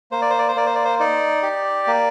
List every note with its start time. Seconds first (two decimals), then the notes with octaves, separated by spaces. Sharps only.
0.12 A#3 C5
0.22 D5
0.30 C5
0.39 D5
0.48 C5
0.56 A#3 D5
0.66 C5
0.75 D5
0.85 C5
1.00 D#4 D5
1.43 G4
1.87 A#3